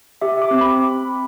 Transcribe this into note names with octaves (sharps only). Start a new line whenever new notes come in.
G4 E5
D6
C4
B5